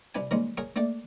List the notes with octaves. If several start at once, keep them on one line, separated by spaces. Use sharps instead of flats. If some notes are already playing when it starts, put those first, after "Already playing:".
C2 C3 D4 B4 G5 G#5
D#3 G3 G#3 A#3 C4 C#4
G#4 A#4 C#5 G5
A3 A#3 D4 D5 G5